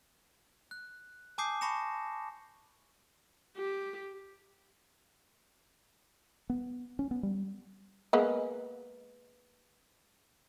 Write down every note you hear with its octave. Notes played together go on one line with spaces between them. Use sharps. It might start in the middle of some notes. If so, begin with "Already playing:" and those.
F#6
G#5 A5 D6 D#6 G6 C7
A5 B5 C#6 A#6 C#7 E7
G4
B3
C#4
B3
G3
G#3 A#3 B3